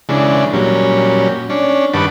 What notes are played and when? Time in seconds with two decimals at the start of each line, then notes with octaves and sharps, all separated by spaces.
0.09 C#3 E3 G#3 D4
0.53 A#2 F#3 G3 C#4
1.50 C#4 D4
1.94 G2 D#3 B4 F#5 A5 D6